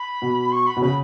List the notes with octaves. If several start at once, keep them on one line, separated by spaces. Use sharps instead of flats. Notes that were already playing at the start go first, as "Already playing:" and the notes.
Already playing: B5
B2
C#6
B5
B2
C#3 B5